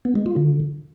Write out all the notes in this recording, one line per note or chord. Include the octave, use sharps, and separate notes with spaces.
B3
G#3
F4
D3